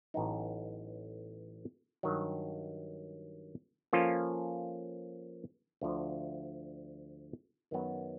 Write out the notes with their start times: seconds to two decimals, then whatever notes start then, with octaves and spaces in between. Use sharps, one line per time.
0.14 A1 A2 F#3 B3 D#4
2.03 G2 D#3 F#3
3.93 F3 A#3 C#4 F4 A4
5.81 D2 D3 F3
7.71 F#2 D#3 F#3 B3